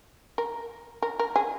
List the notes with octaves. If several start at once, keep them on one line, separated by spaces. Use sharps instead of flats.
A#4
A#4
A#4
G#4